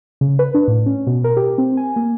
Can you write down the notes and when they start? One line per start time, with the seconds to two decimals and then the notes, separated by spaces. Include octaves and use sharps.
0.21 C#3
0.39 B4
0.54 D4
0.68 A2
0.86 C#4
1.07 B2
1.24 A#4
1.37 G4
1.58 C4
1.77 G#5
1.96 A#3